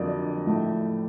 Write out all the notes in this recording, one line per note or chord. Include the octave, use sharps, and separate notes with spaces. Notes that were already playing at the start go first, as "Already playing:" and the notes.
Already playing: F2 D3 F#3 A#3 D5 D#5
A2 F3 A3